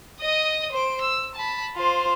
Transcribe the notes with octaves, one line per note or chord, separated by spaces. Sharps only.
D#5 D#6
C5 D7
E6
A5 B5
F4 C5